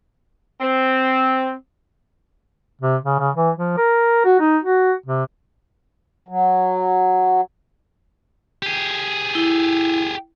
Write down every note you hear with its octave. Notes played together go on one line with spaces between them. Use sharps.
C4
C3
C#3
C#3
E3
F3
A#4
F#4
D#4
F#4
C3
F#3
G4 G#4
E4